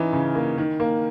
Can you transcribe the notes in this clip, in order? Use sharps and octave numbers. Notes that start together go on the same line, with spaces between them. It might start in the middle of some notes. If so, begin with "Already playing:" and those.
Already playing: E3 C#4 D#4
C#3
A#3
D#3
A#3